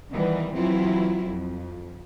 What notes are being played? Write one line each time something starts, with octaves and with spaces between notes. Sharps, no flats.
D#3 E3 G3 B3
E3 F#3 C4 E4 F4
F2